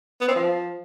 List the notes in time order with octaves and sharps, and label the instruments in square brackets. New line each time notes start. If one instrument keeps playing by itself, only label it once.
[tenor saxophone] B3
C4
F3